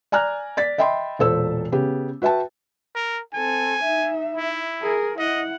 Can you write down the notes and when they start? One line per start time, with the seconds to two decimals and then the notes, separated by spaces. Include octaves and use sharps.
0.12 D5 G#5 A#5 F6 F#6
0.57 D5 A6 B6
0.78 D#5 E5 G5 B5 C6
1.19 E1 A#2 A4 C5 E6
1.72 C#3 B3 G4
2.22 F#4 B4 E5 G5 A5
2.95 A#4
3.34 C4 A4 G#5
3.83 D#4 E5
4.35 E4
4.82 G#4 A#4
5.18 E4 D#5 F#5